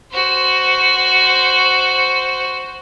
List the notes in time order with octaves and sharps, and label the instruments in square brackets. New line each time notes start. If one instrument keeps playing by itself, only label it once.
[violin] F#4 C5